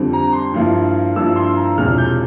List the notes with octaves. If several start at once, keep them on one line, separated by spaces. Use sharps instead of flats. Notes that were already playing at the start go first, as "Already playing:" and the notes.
Already playing: F2 D3 G3 C4
A#5
C6
G2 F3 A#3 E4
G2 F3 A#3 E4 E6
C6
A#5
E1 E2 C3 F3 F6
G6